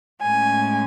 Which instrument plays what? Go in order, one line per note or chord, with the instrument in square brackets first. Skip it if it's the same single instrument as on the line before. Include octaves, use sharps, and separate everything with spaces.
[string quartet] A2 G#3 C#4 G#5